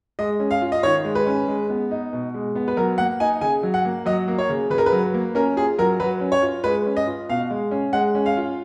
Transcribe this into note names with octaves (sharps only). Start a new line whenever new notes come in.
G#3 D#5
C#4
F5
F4
D#5
D#3 C#5
G#3
B4
C#4
G#3
B3
D#4
B2
G#3
B3
B4
F#3 A#4
A#3 F#5
D#4 G#5
C#3 G#5
F#3
F#5
A#3
F#3 D#5
A#3
C#5
C#3
C#3 B4
A#4
B4
F#3
A#3
C#4 A#4
F4 G#4
F#3 A#4
F#3 B4
C#4
C#5
F4
G#3 B4
C#4
D#5
F4
B2 F5
G#3
C#4
G#3 F#5
C#4
F5
F4